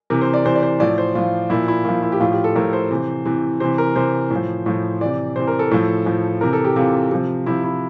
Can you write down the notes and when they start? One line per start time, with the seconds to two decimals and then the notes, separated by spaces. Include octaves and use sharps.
0.10 C3 E3 A#4
0.21 C5
0.34 D5
0.45 C3 E3 C5
0.55 D5
0.63 C5
0.80 A2 F3 D5
0.98 C5
1.15 A2 F3 F4
1.50 A#2 F3 E4
1.68 E4
1.85 A#2 F3 F4
2.02 E4
2.12 G4
2.20 A2 F3 F4
2.32 G4
2.44 A4
2.55 A2 F3 A#4
2.73 C5
2.91 C3 E3
3.26 C3 E3
3.60 C3 E3 C5
3.78 A#4
3.96 C3 E3 C5
4.31 A2
4.36 F3
4.66 A2 F3
5.01 C3 E3 D5
5.36 C3 E3 C5
5.47 A#4
5.59 A4
5.71 A2 F3
6.06 A2 F3
6.41 C3 E3 A#4
6.53 A4
6.64 G4
6.76 C3 E3 F4
7.11 C3 F3
7.46 C3 F3 E4
7.64 E4